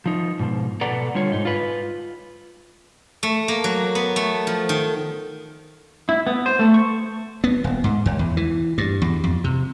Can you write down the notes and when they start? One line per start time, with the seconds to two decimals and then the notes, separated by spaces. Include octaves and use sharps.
0.06 F3 D#4
0.39 G#2 B2 F3
0.81 B2 A4 B4 D5 F#5 A#5
1.15 D3 G3 F4 C#5
1.32 G#2 D#4
1.45 F4 B4
3.23 A3
3.48 A#3
3.64 F#3
3.95 B3
4.16 A3
4.47 F3
4.69 D#3
6.09 E4
6.27 B3
6.46 C5
6.59 A3
6.74 C#6
7.44 B3
7.64 D#1
7.84 G#2
8.06 D#2
8.19 E2
8.37 E3
8.78 G2
9.02 E2
9.24 F2
9.44 C3